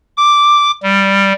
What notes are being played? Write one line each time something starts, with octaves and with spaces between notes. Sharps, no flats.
D6
G3